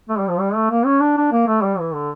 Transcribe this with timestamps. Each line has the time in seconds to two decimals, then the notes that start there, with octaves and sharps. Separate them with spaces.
0.09 A3
0.19 G3
0.29 F3
0.39 G3
0.55 A3
0.71 A#3
0.85 C#4
1.01 D4
1.17 D4
1.32 A#3
1.47 A3
1.62 G3
1.79 E3
1.94 D3